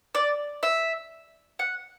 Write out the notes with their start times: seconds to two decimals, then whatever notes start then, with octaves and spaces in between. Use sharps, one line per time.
0.15 D5
0.63 E5
1.59 F#5